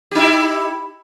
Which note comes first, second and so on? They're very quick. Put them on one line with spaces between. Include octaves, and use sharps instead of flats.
G4 D#4 E4